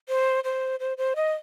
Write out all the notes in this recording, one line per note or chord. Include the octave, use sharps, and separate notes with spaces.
C5
C5
C5
C5
D#5